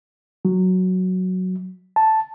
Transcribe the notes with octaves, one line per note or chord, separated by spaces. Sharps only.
F#3
A5